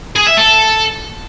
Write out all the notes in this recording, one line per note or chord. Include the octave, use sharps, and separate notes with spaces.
G#4
E5
A4